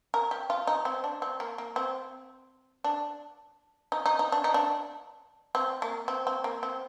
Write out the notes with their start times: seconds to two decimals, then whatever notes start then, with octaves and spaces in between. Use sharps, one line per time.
0.14 A#4
0.31 G4
0.50 F4
0.67 D#4
0.85 C4
1.04 D4
1.22 C4
1.40 A#3
1.58 A#3
1.76 C4
2.84 D4
3.92 D#4
4.06 D#4
4.19 D#4
4.32 D4
4.44 D#4
4.54 D4
5.55 C4
5.82 A#3
6.08 C4
6.27 C4
6.44 A#3
6.63 C4